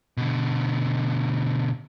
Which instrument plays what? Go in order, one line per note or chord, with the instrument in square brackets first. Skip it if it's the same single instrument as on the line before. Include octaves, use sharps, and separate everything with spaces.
[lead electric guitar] B2 D3